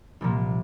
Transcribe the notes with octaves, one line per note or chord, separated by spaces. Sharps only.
C2 A#2 F3 A#3